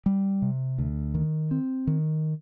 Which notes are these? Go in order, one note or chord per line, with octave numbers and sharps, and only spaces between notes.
G3
C3
D2
D#3
C4
D#3